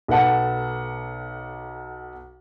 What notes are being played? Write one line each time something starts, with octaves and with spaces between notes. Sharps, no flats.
B1 A4 B4 F#5 A5